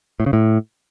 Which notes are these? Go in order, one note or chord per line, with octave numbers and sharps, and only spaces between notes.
A2
C#3
A2